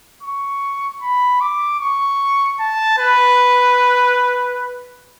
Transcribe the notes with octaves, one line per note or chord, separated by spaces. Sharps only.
C#6
B5
D6
C#6
A5
B4